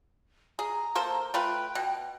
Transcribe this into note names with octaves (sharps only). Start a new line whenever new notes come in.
G#4 A#5
A#3 A4 C5
A3 F4 B4 G5
B2